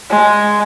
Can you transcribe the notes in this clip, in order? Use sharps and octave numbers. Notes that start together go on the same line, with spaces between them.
G#3